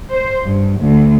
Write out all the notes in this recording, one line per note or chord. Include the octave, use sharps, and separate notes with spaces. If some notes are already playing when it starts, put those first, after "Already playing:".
C5
G2
D2